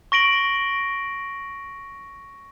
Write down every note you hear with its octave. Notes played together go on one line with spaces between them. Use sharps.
C#6 A#6 D7 F#7